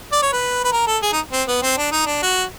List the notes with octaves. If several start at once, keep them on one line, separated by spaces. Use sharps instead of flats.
D5
C#5
B4
B4
A#4
A4
G#4
D#4
C4
B3
C4
D4
D#4
D4
F#4